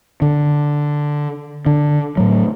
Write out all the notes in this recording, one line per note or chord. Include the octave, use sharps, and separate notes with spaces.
D3
D3
A2 F#3